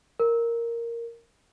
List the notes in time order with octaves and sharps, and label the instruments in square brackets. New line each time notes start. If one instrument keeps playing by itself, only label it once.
[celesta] A#4